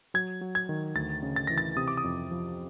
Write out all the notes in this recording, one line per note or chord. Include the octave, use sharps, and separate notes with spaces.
F#3 G#6
F#3
G#6
D#3
D2 A6
C#3
A6
E3 A#6
A6
C3 D#6
D6
D#6
F2
F3